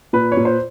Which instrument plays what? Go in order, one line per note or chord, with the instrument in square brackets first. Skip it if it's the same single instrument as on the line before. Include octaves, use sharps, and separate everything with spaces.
[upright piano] A#2 B4
C#5
A#2
C5